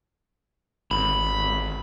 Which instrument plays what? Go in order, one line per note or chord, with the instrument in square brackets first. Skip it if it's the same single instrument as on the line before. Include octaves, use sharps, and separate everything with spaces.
[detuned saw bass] G#1 [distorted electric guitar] B5